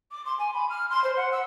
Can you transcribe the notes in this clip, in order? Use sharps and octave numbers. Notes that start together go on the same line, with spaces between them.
D6
C6
G#5
B5
F6
C6
C5
F#5
E6